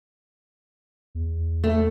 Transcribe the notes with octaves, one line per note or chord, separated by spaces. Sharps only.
E2
A3